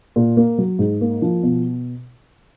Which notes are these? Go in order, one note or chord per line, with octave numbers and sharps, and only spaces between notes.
A#2
A#3
F#3
G#2
A#3
F3
B2